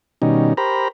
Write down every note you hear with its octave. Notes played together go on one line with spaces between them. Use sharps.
B2 D#3 G3 C#4 D#4
G4 A#4 C5 A#5 B5